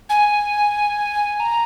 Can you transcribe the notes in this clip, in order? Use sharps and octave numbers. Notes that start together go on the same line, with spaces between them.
G#5
A#5